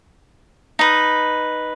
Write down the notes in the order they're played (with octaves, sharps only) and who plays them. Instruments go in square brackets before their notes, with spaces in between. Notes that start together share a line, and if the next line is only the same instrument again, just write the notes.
[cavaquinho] D#4 B4